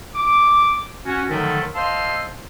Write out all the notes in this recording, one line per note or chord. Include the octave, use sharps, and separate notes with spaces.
D6
C#4 F#4
D3 D#3 F3 F#3 A3 D#4
C5 D#5 F5 A5 C6 E6